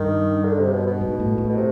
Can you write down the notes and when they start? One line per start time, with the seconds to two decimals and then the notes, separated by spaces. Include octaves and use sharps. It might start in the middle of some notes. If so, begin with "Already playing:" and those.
Already playing: G2 D#3
0.45 D3
0.59 C3
0.72 B2
0.87 B2
1.01 G#2
1.20 A2
1.38 A2
1.50 B2
1.57 C3